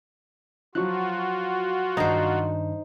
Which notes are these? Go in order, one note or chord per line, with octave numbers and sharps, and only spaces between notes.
F3 F#3 F4 F#4 C#6 F#6
G2 D#3 D4 D#4 C5